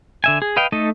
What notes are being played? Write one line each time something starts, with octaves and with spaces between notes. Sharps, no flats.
D3 E5 G#5
G#4
B4 D#5 F5 G5
A3 D#4 A4 D#5